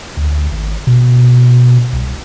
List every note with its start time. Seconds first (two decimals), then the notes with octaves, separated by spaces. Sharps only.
0.17 D2
0.51 G#1
0.87 B2
1.93 C2